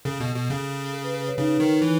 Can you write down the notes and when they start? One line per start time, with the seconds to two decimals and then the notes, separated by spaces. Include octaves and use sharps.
0.05 C#3 A4
0.20 B2
0.35 B2
0.50 C#3
0.93 A4
1.04 B4
1.16 B4
1.27 C#5
1.37 C#3 D#4
1.60 D#3
1.82 E3